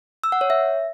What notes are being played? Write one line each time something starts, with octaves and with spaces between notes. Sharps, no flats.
E6
F#5
C#5
E5